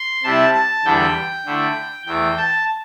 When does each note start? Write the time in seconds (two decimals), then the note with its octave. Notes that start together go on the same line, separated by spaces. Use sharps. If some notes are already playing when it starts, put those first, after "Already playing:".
Already playing: C6
0.23 C3 G3 E4 A5
0.54 A5
0.85 E2 D3 G3 E4 G5
1.46 D3 A3 E4
2.06 E2 E3 A3 G5
2.37 A5